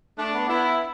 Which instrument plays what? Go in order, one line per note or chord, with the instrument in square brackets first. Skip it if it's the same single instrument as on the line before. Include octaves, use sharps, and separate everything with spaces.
[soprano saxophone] A3 [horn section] D4
[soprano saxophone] B3
[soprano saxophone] B3 [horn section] E4